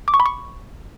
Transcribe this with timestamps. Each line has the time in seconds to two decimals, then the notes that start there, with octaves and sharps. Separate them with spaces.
0.08 D6
0.14 C#6
0.20 B5
0.26 C#6